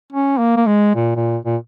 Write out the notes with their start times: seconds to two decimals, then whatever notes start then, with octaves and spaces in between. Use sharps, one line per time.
0.12 C#4
0.39 A#3
0.57 A#3
0.67 G#3
0.95 A#2
1.16 A#2
1.45 A#2